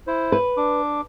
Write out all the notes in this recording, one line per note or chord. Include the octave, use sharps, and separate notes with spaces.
E4 C5
B4
D4 D6